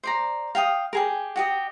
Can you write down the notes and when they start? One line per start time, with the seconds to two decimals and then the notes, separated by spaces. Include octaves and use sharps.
0.03 C5 D5 A#5
0.55 F5 G5 G#5 D#6
0.93 G4 G#4 A#4
1.36 F#4 G4 D#5